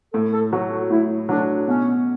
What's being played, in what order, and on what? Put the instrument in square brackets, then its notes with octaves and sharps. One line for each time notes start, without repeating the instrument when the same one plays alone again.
[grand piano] A2 [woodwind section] A4
[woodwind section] A4
[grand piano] F#3 A3 [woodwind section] F#4
[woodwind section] F#4
[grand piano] A2 [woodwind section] E4
[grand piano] F#3 A3 [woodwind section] D4
[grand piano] B2 [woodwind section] C#4